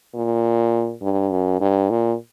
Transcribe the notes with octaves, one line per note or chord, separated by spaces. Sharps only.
A#2
G2
F#2
G2
A#2